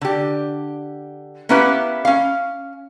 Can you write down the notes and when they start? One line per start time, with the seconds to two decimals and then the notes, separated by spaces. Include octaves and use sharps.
0.01 D3 G4
1.49 A#3 B3 C#4 E4 G4 B4
2.05 C#4 F5